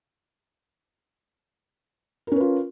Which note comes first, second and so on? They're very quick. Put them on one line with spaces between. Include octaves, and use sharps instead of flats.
A#4 C#4 B4 F4